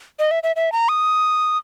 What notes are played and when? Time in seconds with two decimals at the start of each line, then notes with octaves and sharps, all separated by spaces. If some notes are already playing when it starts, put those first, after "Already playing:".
0.19 D#5
0.31 E5
0.43 E5
0.56 E5
0.72 A#5
0.89 D#6